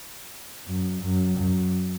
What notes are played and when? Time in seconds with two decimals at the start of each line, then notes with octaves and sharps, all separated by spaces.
0.67 F#2
1.02 F#2
1.38 F#2